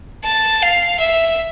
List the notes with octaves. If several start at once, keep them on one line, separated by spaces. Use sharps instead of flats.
A5
F5
E5